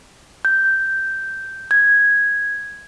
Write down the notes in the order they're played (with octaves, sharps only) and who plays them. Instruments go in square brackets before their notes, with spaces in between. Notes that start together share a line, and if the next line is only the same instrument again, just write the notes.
[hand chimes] G6
G#6